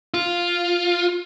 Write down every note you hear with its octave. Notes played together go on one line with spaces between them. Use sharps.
F4